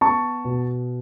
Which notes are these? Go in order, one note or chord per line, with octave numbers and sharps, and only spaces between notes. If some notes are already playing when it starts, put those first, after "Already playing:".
B3 A5 C#6
B2